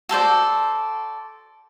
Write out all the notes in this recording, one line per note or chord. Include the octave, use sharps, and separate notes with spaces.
F#4 A4 C5 D5